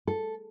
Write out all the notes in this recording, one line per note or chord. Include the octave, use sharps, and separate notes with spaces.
A4